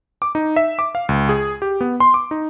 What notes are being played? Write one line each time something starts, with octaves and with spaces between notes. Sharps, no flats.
D6
D#4
E5
D6
F5
C#2
G#4
G4
B3
C6
D6
D#4